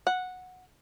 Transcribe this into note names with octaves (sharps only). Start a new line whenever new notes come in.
F#5